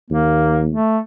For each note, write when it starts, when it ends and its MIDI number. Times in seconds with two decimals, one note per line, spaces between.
0.11 0.73 39
0.11 0.61 58
0.69 0.99 57